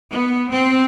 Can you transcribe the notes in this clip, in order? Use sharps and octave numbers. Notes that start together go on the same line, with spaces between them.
B3
C4